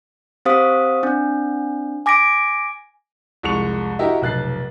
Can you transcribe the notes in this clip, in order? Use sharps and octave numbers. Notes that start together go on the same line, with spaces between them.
C4 G4 C5 F5 D#6 B6
C4 D4
G#5 D6 A#6 B6 D7
C2 F2 G#3 C#6 C#7 F7
E4 F#4 G4 A#4 D#5 E5
F1 B1 F#6 A6 C7